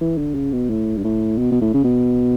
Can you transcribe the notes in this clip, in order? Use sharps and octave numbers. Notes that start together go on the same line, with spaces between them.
E3
D3
C#3
B2
A2
G2
A2
B2
B2
A2
C#3
B2